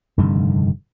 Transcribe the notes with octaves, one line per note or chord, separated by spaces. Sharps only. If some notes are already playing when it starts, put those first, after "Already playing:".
F1 G2 D3 D#3